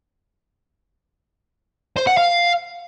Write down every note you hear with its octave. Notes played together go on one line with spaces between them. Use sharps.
C5
F#5
F5